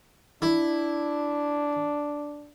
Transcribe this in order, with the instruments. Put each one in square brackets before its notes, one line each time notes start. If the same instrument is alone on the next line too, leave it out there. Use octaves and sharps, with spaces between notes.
[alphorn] D4 [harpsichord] E4